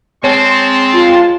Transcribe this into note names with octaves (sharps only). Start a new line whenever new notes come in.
G#3 C4 C#5 A5 C6
F4